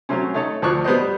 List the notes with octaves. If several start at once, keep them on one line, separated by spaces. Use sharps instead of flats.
F#3 A3 C4 C#4
A3 D#4 A4 C#5
D2 F3 D5 C#6 F#6
G3 B3 B4 C5 D#5